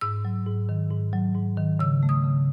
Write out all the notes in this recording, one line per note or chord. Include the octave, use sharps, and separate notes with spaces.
G#2 E6
F#3
G#2
D#3
G#2
F#3
G#2
D#3
C#3 E6
A3
D#6
C#3